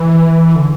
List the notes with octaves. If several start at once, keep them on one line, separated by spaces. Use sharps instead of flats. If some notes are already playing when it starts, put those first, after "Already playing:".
Already playing: E3
D3